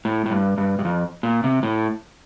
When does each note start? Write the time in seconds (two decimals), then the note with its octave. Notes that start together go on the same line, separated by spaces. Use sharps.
0.05 A2
0.26 A2
0.31 G2
0.58 G2
0.79 G2
0.85 F2
1.23 A#2
1.44 C3
1.63 A2